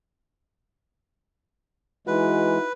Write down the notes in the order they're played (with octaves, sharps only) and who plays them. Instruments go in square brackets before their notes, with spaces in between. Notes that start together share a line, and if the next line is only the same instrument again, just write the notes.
[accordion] E3 G#3 [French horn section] D#4 E4 F#4 [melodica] B4